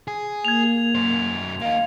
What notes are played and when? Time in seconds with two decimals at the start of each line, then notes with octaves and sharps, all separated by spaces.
0.08 G#4
0.45 A#3 G#6 F7
0.95 F#2 C5
1.61 A#3 D#4 F5